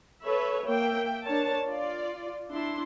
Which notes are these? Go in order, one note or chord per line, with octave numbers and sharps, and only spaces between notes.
A4 B4 C#5 E5 B5
A#3 E5 G5
D4 A#4 C#5 A5
F4 D5
D4 E4 C6